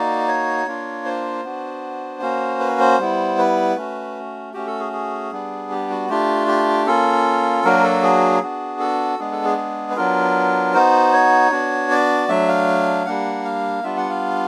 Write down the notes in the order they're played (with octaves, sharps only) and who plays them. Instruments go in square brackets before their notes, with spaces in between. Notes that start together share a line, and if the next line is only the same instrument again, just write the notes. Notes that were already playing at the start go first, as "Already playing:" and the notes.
Already playing: [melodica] A#3 D#4 F#4 D5
C#5
A#3 D4 F4
C5
B3 D4 F#4
A#3 C#4 F#4
B4
C5
G3 B3 E4
B4
A3 C#4 F#4
A3 C#4 F#4 G4
A4
G#4
G#4
G3 B3 D4
G4
F#4
A3 D4 F4 G4
G4
A#3 C#4 F4 A4
F#3 A#3 D4 F#4 A#4
A4
G#4
B3 D4 F#4
A4
G#3 B3 D4 G#4
A4
G#4
G#4
B4
F#3 B3 D4 F4 A#4
B3 D#4 F#4 C5
C#5
B3 D4 F#4
D5
F#3 A3 D4 E5
F5
G3 A#3 D4 F#5
F5
G3 B3 D4 F4 E5
F#5
F5